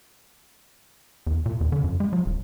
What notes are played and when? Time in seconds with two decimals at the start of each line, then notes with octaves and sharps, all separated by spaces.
1.27 E2
1.46 A#2
1.61 E2
1.72 D3
1.84 F#2
2.00 G#3
2.13 F#3
2.26 D#1